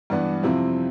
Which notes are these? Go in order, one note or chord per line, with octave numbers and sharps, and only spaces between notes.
G2 E3 B3 D4
F2 C3 F3 C4 E4